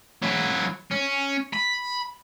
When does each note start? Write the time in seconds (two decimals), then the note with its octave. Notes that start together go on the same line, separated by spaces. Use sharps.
0.22 F#3 E4
0.91 C#4
1.54 B5